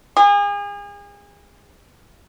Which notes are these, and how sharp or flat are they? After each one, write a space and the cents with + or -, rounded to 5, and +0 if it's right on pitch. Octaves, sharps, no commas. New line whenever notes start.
G#4 -35